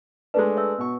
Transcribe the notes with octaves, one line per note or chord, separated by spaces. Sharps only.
G#3 A3 D4 B4
C#5 E5 E6
B2 C#6